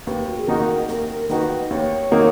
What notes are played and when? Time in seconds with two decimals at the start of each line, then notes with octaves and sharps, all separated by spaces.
0.07 D#2 B4
0.27 F#4
0.38 G#4
0.47 D#3 A#3 D#4 F#4 A#4
0.89 D#2 A#4
1.29 D#3 A#3 D#4 F#4 B4
1.70 D#2 C#5
2.11 D#3 A#3 D#4 F#4